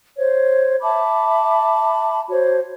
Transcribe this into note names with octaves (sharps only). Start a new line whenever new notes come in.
C5 C#5
E5 A5 B5 D6
F#4 C5 C#5